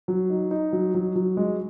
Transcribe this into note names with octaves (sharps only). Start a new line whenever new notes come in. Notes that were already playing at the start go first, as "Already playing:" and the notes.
F#3
D#4
D#4
F#3
F#3
F#3
G#3